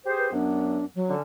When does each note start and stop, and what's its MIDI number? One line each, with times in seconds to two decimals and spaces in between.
0.06 0.28 67
0.06 0.28 68
0.06 0.28 72
0.18 0.31 71
0.32 0.83 42
0.32 0.83 54
0.32 0.83 59
0.32 0.86 62
0.95 1.14 54
1.08 1.22 50
1.08 1.22 61